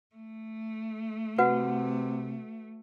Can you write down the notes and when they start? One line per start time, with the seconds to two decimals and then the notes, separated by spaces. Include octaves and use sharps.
0.15 A3
1.38 C3 F#4 B4 F#5